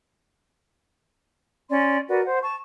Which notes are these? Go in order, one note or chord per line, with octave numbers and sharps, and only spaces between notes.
C#4 D5 C6
F#4 A#4 B4 D5
C5 F#5
A5 C#6